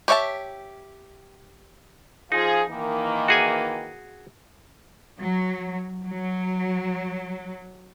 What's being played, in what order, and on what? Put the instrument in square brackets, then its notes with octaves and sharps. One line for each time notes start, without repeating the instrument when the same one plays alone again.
[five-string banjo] G4 C#5 E5 F#5 A5
[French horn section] F3 F4 G#4 [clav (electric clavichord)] D#4
[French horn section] D#3 E3 A#3
[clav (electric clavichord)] F#4 G#4 G#5
[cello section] F#3
F#3